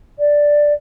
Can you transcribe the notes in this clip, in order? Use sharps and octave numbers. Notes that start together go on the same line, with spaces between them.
D5